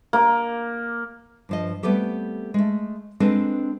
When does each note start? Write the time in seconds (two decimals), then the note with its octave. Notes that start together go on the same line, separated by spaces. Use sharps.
0.13 A#3
1.49 G2 F3 D#5
1.83 G3 A3 B3 C4 G4 A4
2.54 G#3 A3
3.20 G#3 C4 D4 A4 B4